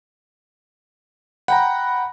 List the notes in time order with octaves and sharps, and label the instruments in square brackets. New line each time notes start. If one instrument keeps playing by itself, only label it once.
[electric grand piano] F#5 G5 A#5 [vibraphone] B5